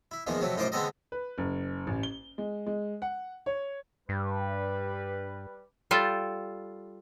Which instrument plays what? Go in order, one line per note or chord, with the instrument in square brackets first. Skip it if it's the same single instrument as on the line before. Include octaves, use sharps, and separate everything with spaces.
[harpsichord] E4
E2 A#2 D#3 F3 G#3 A#3
F2 C3 F#3 A3
F#2 A2 D#4 F4 C5 D6
D3 G#3 B3 C4 A4 D#5
[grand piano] B4
F#1
A1
G7
G#3
G#3
F#5
C#5
[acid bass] G2 [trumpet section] G3 B4
[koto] G3 F4 A4 G5